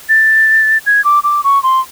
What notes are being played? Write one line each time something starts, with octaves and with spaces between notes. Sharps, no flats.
A6
G#6
D6
D6
C#6
C6